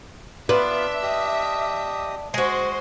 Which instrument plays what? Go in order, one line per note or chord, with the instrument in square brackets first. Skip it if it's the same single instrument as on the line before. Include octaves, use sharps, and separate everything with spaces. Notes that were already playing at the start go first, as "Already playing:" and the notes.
[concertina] B3 F4 F5 [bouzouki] D4 [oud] B4 [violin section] E5
[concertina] G4 D#5 D#6
[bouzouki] G#3 F#4 [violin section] C5